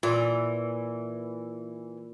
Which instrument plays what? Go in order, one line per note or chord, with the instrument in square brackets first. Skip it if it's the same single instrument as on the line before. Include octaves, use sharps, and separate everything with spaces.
[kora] A#2 [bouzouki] E3